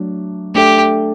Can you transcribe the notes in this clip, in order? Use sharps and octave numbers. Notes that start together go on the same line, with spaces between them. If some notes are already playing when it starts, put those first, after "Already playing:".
Already playing: F#3 A3 D4
A3 D4 G4 A4 E5